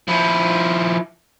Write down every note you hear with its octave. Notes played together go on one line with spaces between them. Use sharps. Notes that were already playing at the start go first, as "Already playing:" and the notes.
F3 E4